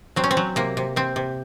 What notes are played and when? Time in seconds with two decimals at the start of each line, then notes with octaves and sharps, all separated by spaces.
0.16 F#3 C4
0.24 C#4
0.31 C4
0.37 F#3
0.56 C3 A#3
0.77 C3
0.96 C3 C4
1.16 C3